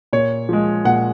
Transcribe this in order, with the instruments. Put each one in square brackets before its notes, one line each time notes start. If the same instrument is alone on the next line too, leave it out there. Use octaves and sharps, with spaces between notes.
[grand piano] A#2 C#5
F3 G#3
A#2 F#5